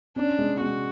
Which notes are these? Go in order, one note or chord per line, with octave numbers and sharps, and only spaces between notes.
C#4 D4
G#3
G#3 F#4